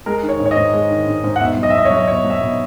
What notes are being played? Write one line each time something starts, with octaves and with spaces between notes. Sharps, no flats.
G#3 A#4
D#3
C#5
G#2
C#5
D#5
G#2
G#3
D#3
G#2
G#2
F#5
B2 E5
F#3
D#5
E5
B2 D#5
C#5
F#3
D#5
B2 C#5
F#3
E5
B2